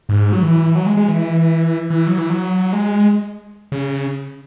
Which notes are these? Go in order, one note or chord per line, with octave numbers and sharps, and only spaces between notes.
G#2
F#3
E3
F#3
G#3
G#3
E3
E3
F#3
E3
F#3
G#3
C#3